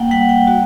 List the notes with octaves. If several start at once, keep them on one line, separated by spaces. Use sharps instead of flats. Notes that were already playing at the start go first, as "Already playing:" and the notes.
Already playing: A#3 F#5 G5
G3 F#5
G5
F#4